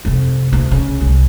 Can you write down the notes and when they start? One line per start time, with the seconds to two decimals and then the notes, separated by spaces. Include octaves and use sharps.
0.05 F2 C3
0.53 D2
0.71 C#3
1.01 C2